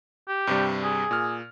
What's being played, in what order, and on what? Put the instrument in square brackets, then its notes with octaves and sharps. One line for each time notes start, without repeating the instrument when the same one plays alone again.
[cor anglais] G4
[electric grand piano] G2 C3 G3
[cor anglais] G#4
[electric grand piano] A#2 F6